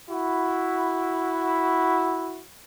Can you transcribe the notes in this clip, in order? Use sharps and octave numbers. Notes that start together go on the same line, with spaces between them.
E4 F#4